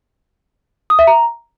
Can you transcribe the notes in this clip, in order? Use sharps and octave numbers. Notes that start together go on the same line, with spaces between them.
D#6
E5
A#5